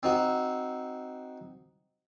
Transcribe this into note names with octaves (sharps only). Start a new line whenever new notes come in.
C4 D#4 F#4